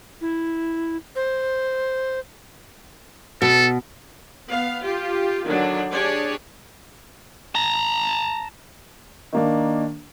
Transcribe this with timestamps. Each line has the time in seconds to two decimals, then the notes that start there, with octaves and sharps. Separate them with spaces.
0.21 E4
1.16 C5
3.42 B2 A4
4.48 B3 F5
4.83 F4 G4
5.44 D3 D#3 F#3 D4
5.91 D4 G4 G#4 C#5 D5
7.55 A5 A#5
9.33 D#3 A#3 D4